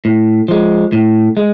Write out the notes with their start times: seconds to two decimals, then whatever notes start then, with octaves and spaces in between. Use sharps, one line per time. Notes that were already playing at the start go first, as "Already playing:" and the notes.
0.05 A2
0.48 F3 G#3
0.93 A2
1.37 G#3